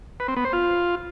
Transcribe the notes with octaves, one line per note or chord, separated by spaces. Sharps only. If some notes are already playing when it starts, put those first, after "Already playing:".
B4
C4
B3
C5
F4